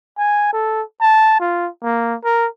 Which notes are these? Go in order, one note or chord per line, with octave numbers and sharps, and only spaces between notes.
G#5
A4
A5
F4
A#3
A#4